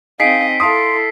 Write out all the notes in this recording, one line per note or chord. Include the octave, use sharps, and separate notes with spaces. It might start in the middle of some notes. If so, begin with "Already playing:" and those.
C4 D#4 G#4 D#5 F5 B6 C7 D7
E4 A4 F5 A5 C6 D#6